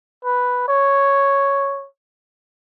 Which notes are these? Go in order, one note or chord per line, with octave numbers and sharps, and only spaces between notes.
B4
C#5